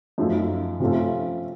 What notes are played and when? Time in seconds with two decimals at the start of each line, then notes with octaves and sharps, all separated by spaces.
0.18 F#2 F3 A3 D#4
0.80 C3 F3 A3 C#4 F4